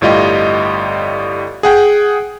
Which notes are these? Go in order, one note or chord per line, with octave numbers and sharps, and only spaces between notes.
G1 A2 G3 F4 D#5
G#4 F#5 G5